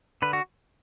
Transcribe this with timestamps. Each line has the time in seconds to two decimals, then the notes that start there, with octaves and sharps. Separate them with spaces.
0.22 D3 B4
0.33 F#4